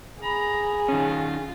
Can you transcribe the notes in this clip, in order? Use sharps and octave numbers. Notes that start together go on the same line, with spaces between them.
G#4 A#5 B5
D#3 C#4 F4